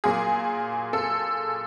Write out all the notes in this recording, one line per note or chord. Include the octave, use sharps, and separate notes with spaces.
A#2 F#3 A#3 G#4
A4